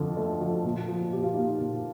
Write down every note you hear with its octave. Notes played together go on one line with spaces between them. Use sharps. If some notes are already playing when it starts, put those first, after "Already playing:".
Already playing: F2 D3 F3
A3
F3
A#2
F3
A#2 G4
F4
A#3 D#4 G4
A#2